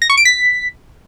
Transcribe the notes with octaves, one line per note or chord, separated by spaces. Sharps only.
A#6
C#6
D7
B6